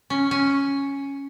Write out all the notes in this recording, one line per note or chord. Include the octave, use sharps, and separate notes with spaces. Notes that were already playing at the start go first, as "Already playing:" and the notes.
C#4
C#4